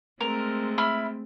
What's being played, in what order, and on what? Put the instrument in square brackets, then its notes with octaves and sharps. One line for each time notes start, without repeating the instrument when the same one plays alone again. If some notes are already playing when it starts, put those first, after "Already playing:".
[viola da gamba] G#3 A3 C4 [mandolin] A#4
[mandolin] E4 B5 F6